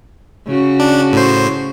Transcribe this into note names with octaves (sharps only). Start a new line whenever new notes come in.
C#3 F#4
D4
A2 C5